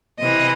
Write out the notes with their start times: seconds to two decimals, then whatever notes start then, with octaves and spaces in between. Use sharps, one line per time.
0.18 C3 E3 D#5